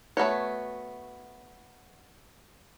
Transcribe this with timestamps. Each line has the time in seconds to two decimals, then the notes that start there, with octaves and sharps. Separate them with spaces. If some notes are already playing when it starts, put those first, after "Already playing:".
0.17 A3 B3 F#4 C#5